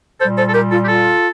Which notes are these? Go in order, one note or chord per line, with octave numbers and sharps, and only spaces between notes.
A#2 G3 A4 C5
A4 C5
A4
G4 A#4
F4 A4
G4
F4 A4